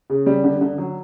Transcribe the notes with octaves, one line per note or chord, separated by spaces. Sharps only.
C#3
G3
D3
D3
F#3